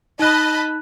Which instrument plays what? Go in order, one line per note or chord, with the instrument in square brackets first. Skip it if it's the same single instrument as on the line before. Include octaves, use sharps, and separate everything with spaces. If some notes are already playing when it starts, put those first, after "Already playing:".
[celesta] D#4 F#6 [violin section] D#5 A5 B5